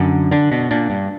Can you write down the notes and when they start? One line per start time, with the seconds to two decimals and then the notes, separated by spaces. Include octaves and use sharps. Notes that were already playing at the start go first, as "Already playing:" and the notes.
Already playing: F#2 D3
0.31 D3 D4
0.51 B2
0.71 A#2 D4
0.90 G2